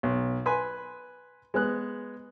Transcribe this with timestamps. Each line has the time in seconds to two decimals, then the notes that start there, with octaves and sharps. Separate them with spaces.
0.03 B1
0.46 B4 G#5 B5 C6
1.54 G#3 B3 F#6